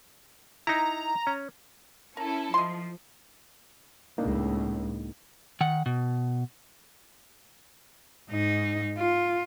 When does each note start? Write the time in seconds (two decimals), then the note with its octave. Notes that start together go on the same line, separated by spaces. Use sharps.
0.67 D#4 E4 A#5
1.27 C#4
2.17 C#4 E4 A4 A#4
2.54 F3 D#5 C6
4.18 C#2 A2 A#3 D4 D#4
5.61 D#3 F#5
5.86 B2
8.30 G#2 D#4
8.98 F4